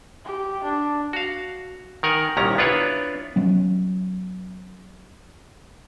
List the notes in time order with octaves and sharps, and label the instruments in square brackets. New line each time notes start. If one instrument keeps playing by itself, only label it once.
[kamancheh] G4
D4
[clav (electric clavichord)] F#4 F5
D#3 A#4 F#5 G#5
C2 A#2 D#3 C#4 A#5
B3 D4 E4 F4 B4 C#5
[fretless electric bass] F#3 B3 C#4